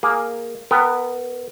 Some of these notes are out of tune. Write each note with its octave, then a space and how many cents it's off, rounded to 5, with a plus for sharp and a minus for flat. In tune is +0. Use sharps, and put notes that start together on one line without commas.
A#3 +0 G#4 +0
B3 +0 A#4 -25 G5 +0